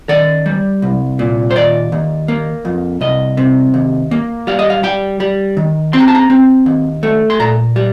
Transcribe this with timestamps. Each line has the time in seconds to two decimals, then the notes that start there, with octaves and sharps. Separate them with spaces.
0.09 D#3 D5
0.46 G3
0.82 C2
1.19 A#2
1.51 C5
1.56 D#2 D5
1.92 D#2
2.28 A#3
2.65 F2
3.01 C2 D#5
3.37 C3
3.74 D#2
4.11 A#3
4.47 G3 F5
4.59 D#5
4.70 F5
4.83 G3 G5
5.20 G3
5.57 D#3
5.93 C4 C6
6.00 A#5
6.08 A5
6.15 A#5
6.30 C4
6.66 D#2
7.03 A3
7.30 C6
7.39 A#2 A#5
7.76 G3